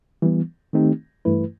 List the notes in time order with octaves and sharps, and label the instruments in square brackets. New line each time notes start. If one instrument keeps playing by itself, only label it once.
[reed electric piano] E3 G3 B3
D#3 A3 C4 D#4 G4
G2 E3 A3 E4 B4